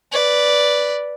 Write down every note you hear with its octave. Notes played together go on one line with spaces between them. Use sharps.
B4 D5